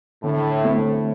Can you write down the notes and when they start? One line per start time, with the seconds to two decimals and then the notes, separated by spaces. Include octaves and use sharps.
0.23 A2 D3
0.64 A3 C4